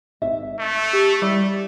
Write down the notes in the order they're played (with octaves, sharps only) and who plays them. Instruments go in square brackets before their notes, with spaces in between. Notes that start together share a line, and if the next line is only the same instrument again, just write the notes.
[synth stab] G#1 [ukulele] E5
[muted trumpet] A3
[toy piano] G4
[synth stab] G3 [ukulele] E4 D5